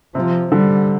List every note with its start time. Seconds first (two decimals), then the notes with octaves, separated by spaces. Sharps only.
0.15 C3 F3
0.52 D3 G3